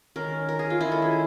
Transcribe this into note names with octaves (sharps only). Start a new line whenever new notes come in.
D#3 G#3 C#4 A#4
A#4
G#4
F4
D#3 G#3 C#4 E4
A4
G#4